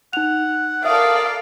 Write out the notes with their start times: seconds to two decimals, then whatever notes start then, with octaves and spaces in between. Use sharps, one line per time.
0.13 D#4 F#5 F7
0.85 A4 A#4 D5 E5 F5 D#6